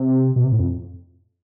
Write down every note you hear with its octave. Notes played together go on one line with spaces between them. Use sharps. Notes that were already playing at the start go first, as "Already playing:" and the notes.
Already playing: C3
B2
C3
A2
F2